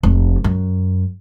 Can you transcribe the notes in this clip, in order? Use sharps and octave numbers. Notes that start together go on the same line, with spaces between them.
F1
F#2